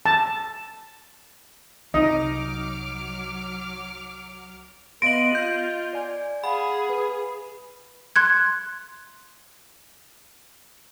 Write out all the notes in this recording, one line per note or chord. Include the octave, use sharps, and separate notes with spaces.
A5
C2 F#3 D#4 D#5 D6 F6
B3 D#5 F5 C6 A#6 D7 D#7 F#7
F4 G6
D5 G#5
G#4 F5 F#5 B5
B4
C6 F#6 G#6